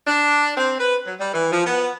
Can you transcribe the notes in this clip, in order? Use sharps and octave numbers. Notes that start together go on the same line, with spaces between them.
D4
C4
B4
F#3
G3
E3
F3
B3